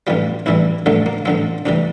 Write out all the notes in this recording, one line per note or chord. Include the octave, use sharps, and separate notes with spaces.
A1 G2 E3 G3 F4
A1 G2 E3 G3 E4
A1 G2 D3 F3 A3
A#3
A1 G2 D3 F3 C4
D2 C3 E3 G3 D4